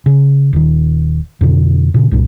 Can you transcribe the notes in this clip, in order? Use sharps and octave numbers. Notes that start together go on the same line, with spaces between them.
C#3
D#1 D#3
F2 B2 D3
A#2 C#3
C2 G2 A#2